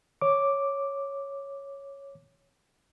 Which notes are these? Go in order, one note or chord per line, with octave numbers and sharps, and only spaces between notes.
C#5 D6